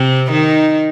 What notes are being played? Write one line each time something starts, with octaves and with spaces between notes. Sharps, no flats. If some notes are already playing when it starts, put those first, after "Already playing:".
Already playing: C3 C4
D#3 D#4